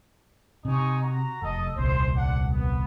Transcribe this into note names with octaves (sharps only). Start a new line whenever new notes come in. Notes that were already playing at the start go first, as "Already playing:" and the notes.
C3 D#4 G#5 C#6
F#4 A#5
F1 A4 D#5
D#1 C2 C5
D4 F#5
B3